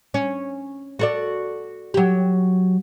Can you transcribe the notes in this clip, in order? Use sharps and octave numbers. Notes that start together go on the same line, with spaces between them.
C#4
F#4 A4 D5
F#3 G4